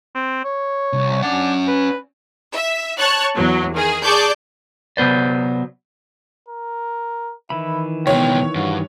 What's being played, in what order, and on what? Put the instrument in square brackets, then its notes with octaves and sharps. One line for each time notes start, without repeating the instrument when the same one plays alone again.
[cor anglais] C4
C#5
[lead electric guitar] C2
[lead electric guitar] C#4 F#5 [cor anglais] D4
[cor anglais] B4
[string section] E5
C#5 A5 C#6 F#6
E2 F#3
D#3 G#4
G#4 D5 A5 C#6 D6 G6
[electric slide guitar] C3 F#3 B3 C5 D5
[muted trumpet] A#4
[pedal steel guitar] D#3 E3 B5 [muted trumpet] E4
[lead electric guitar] C#2 B2 [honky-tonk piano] C#5 [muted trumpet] G5
[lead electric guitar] G2 [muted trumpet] F#4